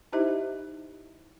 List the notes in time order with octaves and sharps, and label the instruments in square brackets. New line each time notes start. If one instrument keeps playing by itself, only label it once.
[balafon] D#4 E4 G4 C5 D#5 E5